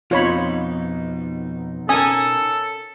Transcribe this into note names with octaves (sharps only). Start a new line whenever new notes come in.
F2 B2 D#4 F4 C#5 B5
C#4 A4 A#4 G#5 D#6